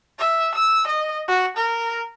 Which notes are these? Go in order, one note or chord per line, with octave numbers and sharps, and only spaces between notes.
E5
E6
D#5
F#4
A#4